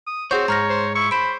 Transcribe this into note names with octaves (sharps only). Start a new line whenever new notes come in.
D#6
C4 F#4 G#4 C5 C#5 G6
G#2 C#5 A#5 F6 A#6
C5
E4 C#6
C5 B5 D7 E7